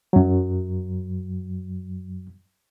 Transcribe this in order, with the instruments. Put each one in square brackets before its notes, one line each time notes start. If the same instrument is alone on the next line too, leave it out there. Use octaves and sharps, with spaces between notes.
[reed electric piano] F#2 F#3